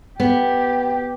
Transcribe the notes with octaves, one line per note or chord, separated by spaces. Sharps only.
B3 G4